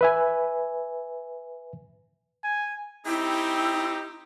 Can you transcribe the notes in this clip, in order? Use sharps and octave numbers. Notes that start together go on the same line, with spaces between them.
B4 E5 G#5
G#5
C4 D#4 E4 G4